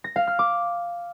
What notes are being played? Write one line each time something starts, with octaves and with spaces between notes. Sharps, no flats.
A#6
F5
F6
D6